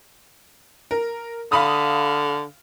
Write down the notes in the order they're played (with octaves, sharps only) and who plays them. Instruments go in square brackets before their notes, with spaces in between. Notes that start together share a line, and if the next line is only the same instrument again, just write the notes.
[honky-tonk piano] A#4
[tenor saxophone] D3 [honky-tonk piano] F5 B5 D#6